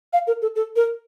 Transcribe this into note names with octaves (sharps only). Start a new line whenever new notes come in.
F5
A#4
A4
A4
A#4